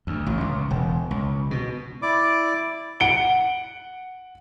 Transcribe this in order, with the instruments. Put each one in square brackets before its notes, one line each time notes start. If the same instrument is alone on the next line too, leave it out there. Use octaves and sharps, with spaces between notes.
[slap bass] D2
A1
C#2
E1
C#2
B2
[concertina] E4 D5 D6
[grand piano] F#5 D7 G7